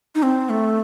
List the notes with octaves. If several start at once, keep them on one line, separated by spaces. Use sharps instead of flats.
D#4
C4
A3